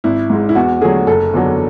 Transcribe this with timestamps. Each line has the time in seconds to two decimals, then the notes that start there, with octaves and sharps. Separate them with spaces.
0.04 G#1 E4
0.30 G#2 G#3
0.49 E4
0.55 E2 F#4
0.81 D3 F#3 A3 G#4
1.07 F#1 A4
1.33 E2 D3 F#3